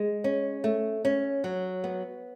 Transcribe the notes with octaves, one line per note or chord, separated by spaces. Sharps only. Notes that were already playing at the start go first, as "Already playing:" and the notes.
Already playing: G#3
C#4
A3
C#4
F#3
B3